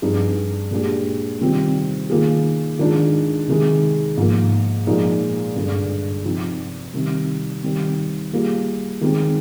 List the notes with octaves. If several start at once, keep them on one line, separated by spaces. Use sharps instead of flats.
G2 F3 C4 D#4 G#4
A#2 G#3 D4 G4
C3 D#3 G3 C4 F4
D#3 A#3 F4 G#4
D#3 G#3 D4 F4
C3 D#3 G#3
G#2 F3 A#3
A#2 F3 G#3 D#4
G2 D3 G#3
C3 F3 C4 D#4
C3 D#3 G3
D#3 G3 C4
G3 A#3 F4 G#4
D#3 G#3 C4